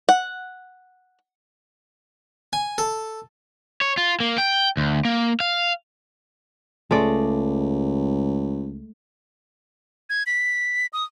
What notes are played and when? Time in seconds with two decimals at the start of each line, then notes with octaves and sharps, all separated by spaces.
0.09 F#5
2.53 G#5
2.78 A4
3.81 C#5
3.97 F4
4.20 A#3
4.38 G5
4.77 D2
5.05 A#3
5.40 F5
6.91 C#2 G#3 A3 D5
10.10 G#6
10.26 B6
10.93 D#6